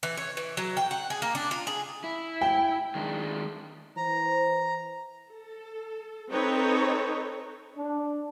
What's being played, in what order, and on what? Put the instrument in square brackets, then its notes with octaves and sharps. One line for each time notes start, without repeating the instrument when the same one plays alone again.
[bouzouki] E3
C#5
E3
F#3
G5
F#5
G#4
A#3
D4
F4
G#4
[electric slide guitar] E4
[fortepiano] G5
[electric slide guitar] D#3 G#3 D4
[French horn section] E3 C5 [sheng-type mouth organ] A#5
[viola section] A4
C4 D#4 A4 B4 C#5
[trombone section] D4